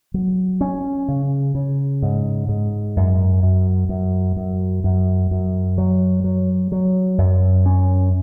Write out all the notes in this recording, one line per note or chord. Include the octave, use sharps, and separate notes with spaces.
F#3
C#4
C#3
C#3
G#2
G#2
F#2
F#2
F#2
F#2
F#2
F#2
F#3
F#3
F#3
F#2
C#4